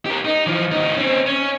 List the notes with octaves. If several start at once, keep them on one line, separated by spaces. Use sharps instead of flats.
G4 A#4
D#4
E3 F3
C#2 D#4
C4 C#4
C#4